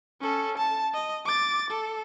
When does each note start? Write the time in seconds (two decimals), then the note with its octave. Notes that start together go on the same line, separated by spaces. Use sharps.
0.21 C#4 A4
0.58 A5
0.94 D#5
1.25 D6 A6
1.70 A4